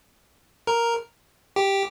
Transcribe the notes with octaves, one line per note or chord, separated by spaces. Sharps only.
A#4
G4